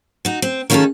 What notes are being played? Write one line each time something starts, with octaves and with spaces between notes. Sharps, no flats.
D#4 F#4
C4
D#3 C#4 F4 F#4 G#4 A4